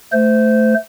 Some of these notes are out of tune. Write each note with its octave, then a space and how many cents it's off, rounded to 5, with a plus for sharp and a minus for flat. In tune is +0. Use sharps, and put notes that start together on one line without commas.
A3 +0 C5 -20